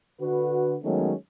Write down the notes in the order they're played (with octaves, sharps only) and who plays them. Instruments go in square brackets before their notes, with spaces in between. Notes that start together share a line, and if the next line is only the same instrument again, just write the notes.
[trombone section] D3 F#4 B4
D#3 F#3 G#3 A3 B3 C#4